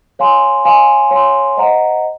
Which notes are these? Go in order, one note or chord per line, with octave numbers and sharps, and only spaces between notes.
C#5 F5 G#5 C6
C#5 F5 G#5 C6
C#5 F5 G#5 C6
C5 D#5 F#5 A#5